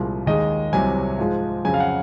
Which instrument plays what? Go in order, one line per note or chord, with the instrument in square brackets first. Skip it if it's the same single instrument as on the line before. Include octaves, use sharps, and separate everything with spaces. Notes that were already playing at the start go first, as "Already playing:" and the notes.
Already playing: [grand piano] C2 A#2 F3 G#3
D#2 D#3 G#3 D#5
C2 C3 F#3 G#5
G#2 F3 G#3
F2 C#3 F#3 G#5
F5
F#5